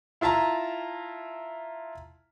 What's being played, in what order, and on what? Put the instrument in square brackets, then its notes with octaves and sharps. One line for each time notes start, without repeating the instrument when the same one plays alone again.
[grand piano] E4 F4 E5 A5 A#5